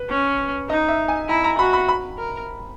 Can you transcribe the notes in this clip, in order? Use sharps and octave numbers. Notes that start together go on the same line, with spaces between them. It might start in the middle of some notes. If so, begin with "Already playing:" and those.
Already playing: B4
C#4
D#4 D#5
E5
G#5
E4 A#5
A#5
F#4 B5
B5
B5
A#4